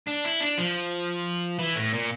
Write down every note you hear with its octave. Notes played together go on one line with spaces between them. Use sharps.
D4
E4
D4
F3
E3
A2
A#2